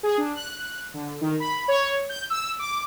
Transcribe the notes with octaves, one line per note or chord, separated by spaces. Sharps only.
G#4
D4
F#6
D3
D#3
B5
C#5
G6
E6
D6